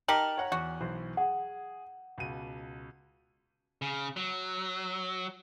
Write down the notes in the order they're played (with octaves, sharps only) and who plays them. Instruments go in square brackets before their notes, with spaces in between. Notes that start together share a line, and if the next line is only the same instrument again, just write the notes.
[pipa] D#4 G4 A#4 [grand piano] A5 A#5 [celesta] F#7
[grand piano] C#5 F#5 A#5
[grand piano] E2 [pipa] F#4
[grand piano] B1 E3 C5
[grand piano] G#4 [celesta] F#5
[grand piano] C#2 B2 D#7
[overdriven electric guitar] C#3
F#3